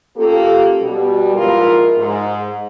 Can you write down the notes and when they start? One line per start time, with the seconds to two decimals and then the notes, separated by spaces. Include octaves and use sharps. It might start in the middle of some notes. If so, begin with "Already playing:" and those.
0.17 A#3 C#4 F4 G4 A4
0.80 B2 G3
1.35 G#2 F3 E4 F4 A#4
1.97 G#2